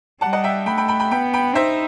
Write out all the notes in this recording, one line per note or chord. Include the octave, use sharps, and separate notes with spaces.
G3 F#5 A5
D#5 F#5
E5 G5
A3 G5 B5
G5 B5
G5 B5
G5 B5
B3 G5 B5
G5 B5
D#4 C5 E5